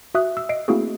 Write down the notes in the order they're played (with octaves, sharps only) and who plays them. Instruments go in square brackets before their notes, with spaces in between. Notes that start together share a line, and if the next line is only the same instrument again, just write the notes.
[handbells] F#4 E5 D#6 F#6
E6
D#5 C7 D7
A3 A#3 C4 E4 F#4 G#4